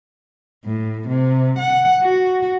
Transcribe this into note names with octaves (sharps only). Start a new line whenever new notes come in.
A2
C3
F#5
F#4